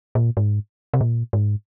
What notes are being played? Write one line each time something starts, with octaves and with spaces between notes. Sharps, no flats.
A#2
G#2
C3
A#2
G#2